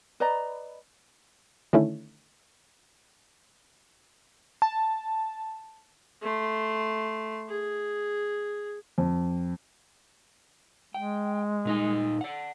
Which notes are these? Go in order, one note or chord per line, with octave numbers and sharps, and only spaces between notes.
B4 D5 D#5 A#5
D3 D#3 A3 C#4 E4
A5
A3 C6
G#4
F2
G#3 G5
A#2 D#4 D#5
D5 F#5